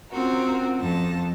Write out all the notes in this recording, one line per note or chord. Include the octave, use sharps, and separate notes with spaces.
C4 C#4 F4 F#4 A#4
F2 A5 A#6